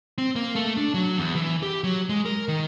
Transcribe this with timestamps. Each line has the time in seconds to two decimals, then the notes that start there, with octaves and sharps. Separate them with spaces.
0.18 C4
0.36 A#3
0.55 A3
0.77 D4
0.94 F#3
1.17 E2
1.35 E3
1.63 G4
1.84 F#3
2.09 G#3
2.25 A#4
2.48 D#3